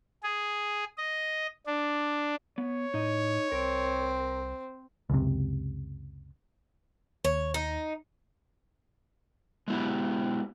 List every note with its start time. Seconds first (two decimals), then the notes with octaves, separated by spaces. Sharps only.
0.23 G#4
0.98 D#5
1.67 D4
2.58 B3 C#5
2.94 A2 D#4 D#5
3.52 C2 C4 A#4
5.10 C#2 F#2 C3
7.25 D#2 C#5
7.54 D#4
9.68 G#3 B3 E4 G4